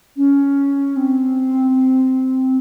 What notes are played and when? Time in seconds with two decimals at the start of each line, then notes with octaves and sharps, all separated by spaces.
0.17 C#4
0.96 C4